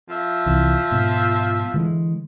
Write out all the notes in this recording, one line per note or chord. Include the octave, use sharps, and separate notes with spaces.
F3 E5
C2 E3
G#2 B2
D3 E3 G#3